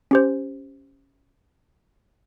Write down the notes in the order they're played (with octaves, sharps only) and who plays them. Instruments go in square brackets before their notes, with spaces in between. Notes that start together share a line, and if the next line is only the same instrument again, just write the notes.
[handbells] C#4 G4 C5